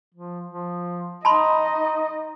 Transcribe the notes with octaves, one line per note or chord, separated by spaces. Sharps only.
F3
F3
D#4 D#5 A5 B5 C6